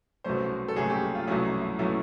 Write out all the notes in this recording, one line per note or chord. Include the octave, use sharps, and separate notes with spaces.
C2 B2 F#3 A3 C#4 C5
A4
C2 B2 F#3 A3 C#4 G#4
G4
F4
C2 B2 F#3 A3 C#4 E4
E4
E4
B2 F#3 A3 C#4 E4